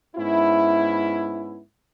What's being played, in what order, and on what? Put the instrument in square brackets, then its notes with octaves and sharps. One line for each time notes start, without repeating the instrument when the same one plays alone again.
[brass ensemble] G#2 B3 C#4 E4